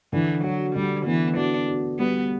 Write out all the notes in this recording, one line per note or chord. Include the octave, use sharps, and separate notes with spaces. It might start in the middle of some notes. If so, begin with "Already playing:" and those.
D3 E3
F#3 F#4
D3 G3
E3 B3
D4 F#4
F#4
G3 B3